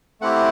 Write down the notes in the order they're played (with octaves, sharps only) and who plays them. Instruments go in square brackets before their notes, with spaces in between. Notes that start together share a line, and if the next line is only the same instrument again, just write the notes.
[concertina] A3 C4 E4 G4 F#5